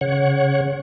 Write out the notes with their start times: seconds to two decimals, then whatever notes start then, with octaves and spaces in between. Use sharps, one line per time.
0.01 C#3 C#5 F#5